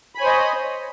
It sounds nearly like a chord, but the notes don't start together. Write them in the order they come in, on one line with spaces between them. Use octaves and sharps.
B5 G#5 C#5 C5 D#5